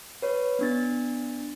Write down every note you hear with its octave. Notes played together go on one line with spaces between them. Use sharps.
B4 C#5
B3 D4 A6